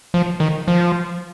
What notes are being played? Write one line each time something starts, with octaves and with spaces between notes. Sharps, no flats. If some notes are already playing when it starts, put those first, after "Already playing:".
F3
D#3
F3